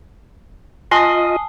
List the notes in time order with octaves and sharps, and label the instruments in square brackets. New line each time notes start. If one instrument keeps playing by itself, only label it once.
[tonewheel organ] F4 D#5 [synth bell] G#5 A5 [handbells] D#6 C7